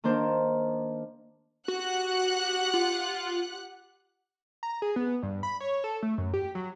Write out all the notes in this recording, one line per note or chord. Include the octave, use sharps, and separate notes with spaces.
D#3 A#3 D4 C5
F#4 G4 F#5 F#6
F4
A#5
G#4
B3
G2
B5
C#5
A4
A3
F#2
G4
F#3